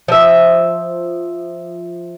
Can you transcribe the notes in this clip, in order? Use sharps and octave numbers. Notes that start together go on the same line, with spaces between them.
F3 E5